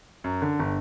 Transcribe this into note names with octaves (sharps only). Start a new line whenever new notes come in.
F#2
D3
G1